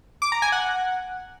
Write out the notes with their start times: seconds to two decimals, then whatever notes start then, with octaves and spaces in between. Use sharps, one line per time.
0.22 D6
0.32 A#5
0.42 G#5
0.52 F#5